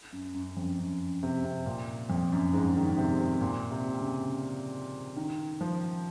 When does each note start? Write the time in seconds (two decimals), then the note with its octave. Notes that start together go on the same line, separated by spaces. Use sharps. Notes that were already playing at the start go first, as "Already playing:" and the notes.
0.13 F#2
0.34 F#2
0.57 F2
0.79 F#2
1.23 C3
1.44 C3
1.66 A#2
2.10 F2
2.32 F#2
2.53 G#2
2.76 D#3
2.98 C3
3.19 C3
3.41 A#2
3.71 C3
4.00 C#3
5.17 D#3
5.61 F3